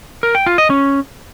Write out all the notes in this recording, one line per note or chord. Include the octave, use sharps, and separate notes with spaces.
A#4
G5
F4
D#5
C#4